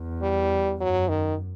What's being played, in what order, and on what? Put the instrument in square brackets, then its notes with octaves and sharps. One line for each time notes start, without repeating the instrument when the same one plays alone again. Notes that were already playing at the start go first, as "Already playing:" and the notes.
Already playing: [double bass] E2
[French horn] G3
[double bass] F#2 [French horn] F#3
[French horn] D#3